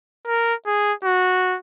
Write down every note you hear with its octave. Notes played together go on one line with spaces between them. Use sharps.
A#4
G#4
F#4